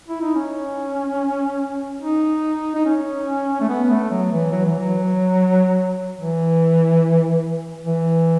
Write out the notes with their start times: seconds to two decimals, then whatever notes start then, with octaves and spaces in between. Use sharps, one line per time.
0.09 E4
0.22 D#4
0.35 C#4
2.02 D#4
2.75 D#4
2.86 C#4
3.61 A3
3.69 B3
3.90 A3
4.11 F#3
4.32 E3
4.52 F#3
4.66 E3
4.79 F#3
6.19 E3
7.86 E3